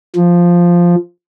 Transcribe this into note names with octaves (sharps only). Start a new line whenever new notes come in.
F3